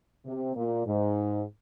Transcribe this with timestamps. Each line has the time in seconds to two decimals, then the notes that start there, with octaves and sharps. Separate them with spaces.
0.25 C3
0.56 A#2
0.86 G#2